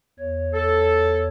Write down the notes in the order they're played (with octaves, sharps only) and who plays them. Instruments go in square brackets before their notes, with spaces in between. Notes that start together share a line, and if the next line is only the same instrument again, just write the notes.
[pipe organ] E2 C#5
[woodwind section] A4